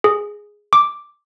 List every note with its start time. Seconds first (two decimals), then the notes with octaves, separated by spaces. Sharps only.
0.04 G#4
0.73 D6